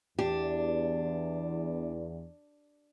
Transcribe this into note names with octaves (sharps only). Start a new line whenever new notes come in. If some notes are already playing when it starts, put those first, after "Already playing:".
E2 D4 G4